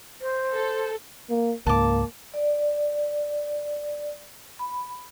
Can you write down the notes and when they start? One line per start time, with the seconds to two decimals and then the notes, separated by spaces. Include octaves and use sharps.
0.21 C5
0.52 A4
1.30 A#3
1.67 C#2 G#2 A#3 A5 D6
2.34 D5
4.59 B5